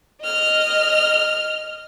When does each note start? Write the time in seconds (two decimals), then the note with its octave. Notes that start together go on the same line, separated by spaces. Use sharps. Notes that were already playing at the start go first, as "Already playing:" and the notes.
0.22 D#5 F6